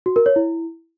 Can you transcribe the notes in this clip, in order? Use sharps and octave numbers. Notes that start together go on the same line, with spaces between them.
F#4
A#4
C#5
E4